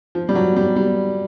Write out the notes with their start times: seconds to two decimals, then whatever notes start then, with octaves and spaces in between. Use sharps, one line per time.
0.15 F3
0.29 G3
0.35 F#3
0.56 G3
0.76 G3